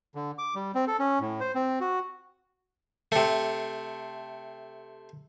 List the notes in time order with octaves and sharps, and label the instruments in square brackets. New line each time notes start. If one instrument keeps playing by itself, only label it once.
[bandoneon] D3
D6
G3
C4
A4
C#4
A2
C5
C4
F#4
[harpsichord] C3 A3